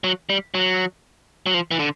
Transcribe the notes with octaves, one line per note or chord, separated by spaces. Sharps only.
F#3
G3
F#3
F#3
F3
E3
D3